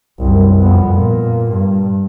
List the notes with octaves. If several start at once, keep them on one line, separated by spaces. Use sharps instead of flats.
C2 F#2
F2 B3
A#2
G2